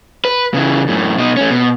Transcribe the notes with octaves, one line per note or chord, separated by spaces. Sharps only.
B4
C#3 E3
F#2 A2
B2 D#4
A3 C#4
B2